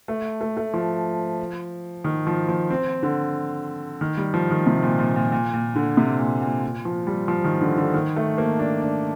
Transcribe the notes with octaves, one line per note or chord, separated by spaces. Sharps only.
A3
A3
A3
F3
D#3
F3
F3
C4
D3
D#3
G3
F3
D#3
C3
A#2
A#2
A#2
A#2
A#2
D3
C3
A#2
A#2
A#2
F3
G3
F3
D#3
D3
D3
D#3
A3
A#3
D4
D4